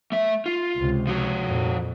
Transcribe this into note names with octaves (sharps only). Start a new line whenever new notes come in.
A3 E5
F4
C#2 C3
F3 F#4
F2 A#2